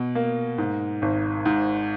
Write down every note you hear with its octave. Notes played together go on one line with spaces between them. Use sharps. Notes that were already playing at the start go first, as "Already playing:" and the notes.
Already playing: B2
A#3
G#2
G#1
G#2